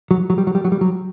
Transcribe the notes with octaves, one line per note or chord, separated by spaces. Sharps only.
F#3
F#3
G3
F#3
G3
F#3
G3
F#3